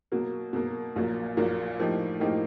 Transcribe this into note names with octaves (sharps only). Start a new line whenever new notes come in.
B2 F#3 A#3
B2 F#3 A#3
A#1 A#2 F#3 A#3
A#1 A#2 F#3 A#3
A2 F3 A#3 D#4 G4
A2 F3 A#3 D#4 G4